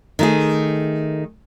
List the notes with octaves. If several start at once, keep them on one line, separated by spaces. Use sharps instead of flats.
D#3 A3 G#4